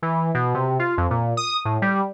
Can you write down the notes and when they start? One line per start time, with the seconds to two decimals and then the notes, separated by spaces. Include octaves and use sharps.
0.02 E3
0.34 B2
0.54 C3
0.79 F4
0.98 F2
1.10 A#2
1.37 D#6
1.65 A2
1.82 G3